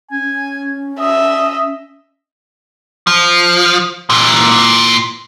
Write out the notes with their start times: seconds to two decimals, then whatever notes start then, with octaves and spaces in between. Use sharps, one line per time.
0.11 C#4 G#5
1.00 D#5 E5
3.07 F3
4.10 A#2 E3